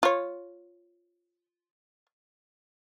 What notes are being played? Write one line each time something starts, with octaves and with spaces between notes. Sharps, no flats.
F4 C#5